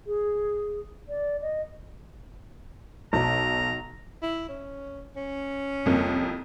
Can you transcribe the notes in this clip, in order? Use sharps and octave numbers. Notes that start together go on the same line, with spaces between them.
G#4
D5
D#5
B1 A#5
E4
C#4
C#4
C2 F2 A#3